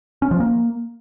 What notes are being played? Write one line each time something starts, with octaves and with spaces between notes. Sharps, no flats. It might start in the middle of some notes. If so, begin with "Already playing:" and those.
C#4
F3
A#3